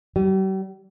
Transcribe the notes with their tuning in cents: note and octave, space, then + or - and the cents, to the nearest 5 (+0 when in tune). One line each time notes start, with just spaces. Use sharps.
G3 -45